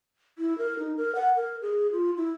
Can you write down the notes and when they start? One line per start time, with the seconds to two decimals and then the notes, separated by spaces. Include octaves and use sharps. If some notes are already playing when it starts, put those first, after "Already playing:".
0.38 E4
0.58 A#4
0.79 D#4
0.97 A#4
1.15 F#5
1.36 A#4
1.62 G#4
1.92 F4
2.17 E4